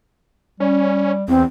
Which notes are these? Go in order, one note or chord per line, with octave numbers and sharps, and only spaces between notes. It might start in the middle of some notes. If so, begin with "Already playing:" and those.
G3 C#4
E2 C4